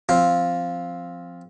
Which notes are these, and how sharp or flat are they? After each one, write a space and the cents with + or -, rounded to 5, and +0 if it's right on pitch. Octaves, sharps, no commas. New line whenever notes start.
F3 +0 C4 +0 F4 +0